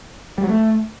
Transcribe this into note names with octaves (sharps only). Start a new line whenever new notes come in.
G3
F#3
A3